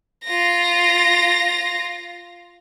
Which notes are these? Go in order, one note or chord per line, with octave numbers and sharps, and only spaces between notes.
F4 A#6